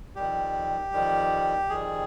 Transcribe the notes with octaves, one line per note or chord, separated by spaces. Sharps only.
F2 D#3 G3 G4
F2 D#3 G3
F2 D#3 G3 G#4